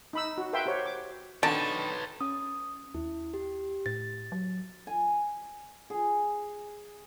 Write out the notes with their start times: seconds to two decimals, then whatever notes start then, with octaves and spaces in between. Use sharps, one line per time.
0.13 D#4 B5 E6
0.38 F#4
0.53 A#4 B4 E5 F5 G5 C6
0.66 F#4 G4 C5 C#5
0.85 D6
1.43 D3 D#3 B4 C#5 A5
2.21 C#4 D#6
2.94 D#2 E4
3.34 G4
3.86 A2 A6
4.32 F#3
4.87 G#5
5.90 G#4